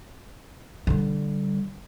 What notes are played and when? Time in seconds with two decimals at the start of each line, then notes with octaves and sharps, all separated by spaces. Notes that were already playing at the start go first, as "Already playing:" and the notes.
0.87 D3 G3